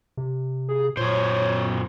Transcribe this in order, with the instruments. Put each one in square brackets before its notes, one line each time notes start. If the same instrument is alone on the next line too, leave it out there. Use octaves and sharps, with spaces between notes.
[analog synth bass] C3
[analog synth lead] G#4
[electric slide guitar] F#2 C5 [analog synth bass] A#2 [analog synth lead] C#5